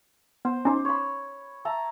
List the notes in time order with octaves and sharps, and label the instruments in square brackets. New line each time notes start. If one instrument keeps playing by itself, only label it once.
[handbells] B3 [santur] C5
[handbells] C#4 D#4 [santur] C5 D6
[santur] C#5 B5
E5 A5 A#5